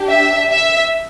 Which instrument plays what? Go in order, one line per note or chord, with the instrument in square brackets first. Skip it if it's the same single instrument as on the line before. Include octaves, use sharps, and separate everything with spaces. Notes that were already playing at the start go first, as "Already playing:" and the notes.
Already playing: [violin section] D4 G4
E5
E5